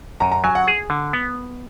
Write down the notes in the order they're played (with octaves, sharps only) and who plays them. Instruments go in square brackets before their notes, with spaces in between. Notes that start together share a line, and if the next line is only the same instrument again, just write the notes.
[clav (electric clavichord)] F#2 [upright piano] A#5
[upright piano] A#5
[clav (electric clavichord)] F#3 [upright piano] G#5
[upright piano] F#5
[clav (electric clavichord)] G#4
D3
B3